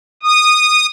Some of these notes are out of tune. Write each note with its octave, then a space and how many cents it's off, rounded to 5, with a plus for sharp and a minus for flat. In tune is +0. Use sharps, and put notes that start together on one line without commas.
D#6 -15